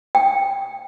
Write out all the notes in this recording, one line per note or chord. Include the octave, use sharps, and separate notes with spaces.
G5